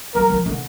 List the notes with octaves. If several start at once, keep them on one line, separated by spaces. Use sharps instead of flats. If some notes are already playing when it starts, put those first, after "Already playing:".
G3 A#4
F3
D3